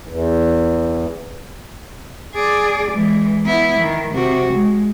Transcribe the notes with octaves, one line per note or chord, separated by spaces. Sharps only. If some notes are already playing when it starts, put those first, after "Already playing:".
E2
G#4 D5
E3 G#3
B3 E4
D#3
C3 F#4
G#3